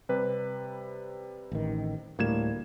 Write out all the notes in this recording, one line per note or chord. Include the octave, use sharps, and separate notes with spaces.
C3 G3 B4
A1 D#3
D2 A2 G3 A#3 G#6 E7